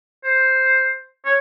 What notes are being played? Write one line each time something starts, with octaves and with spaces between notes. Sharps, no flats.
C5
C#5